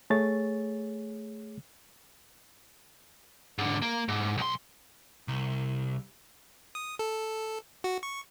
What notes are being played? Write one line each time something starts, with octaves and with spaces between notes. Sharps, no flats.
A3 G#4 C#5 A6
G#2 D3
A#3
G#2
B1 C6
C2
D#6
A4
F#4
C#6